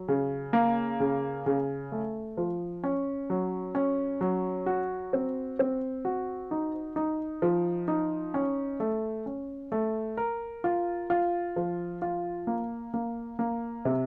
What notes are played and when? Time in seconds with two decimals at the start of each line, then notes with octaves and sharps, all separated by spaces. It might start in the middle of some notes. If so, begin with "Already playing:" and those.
Already playing: F#3
0.08 C#3
0.53 A#3
1.00 C#3
1.46 C#3
1.92 A3
2.37 F3
2.84 C#4
3.30 F#3
3.75 C#4
4.21 F#3
4.66 F#4
5.13 C4
5.59 C4
6.05 F#4
6.51 D#4
6.96 D#4
7.42 F3
7.88 D#4
8.34 C#4
8.80 A3
9.26 C#4
9.72 A3
10.17 A#4
10.64 F4
11.10 F4
11.56 F3
12.02 F4
12.47 A#3
12.94 A#3
13.39 A#3
13.85 C3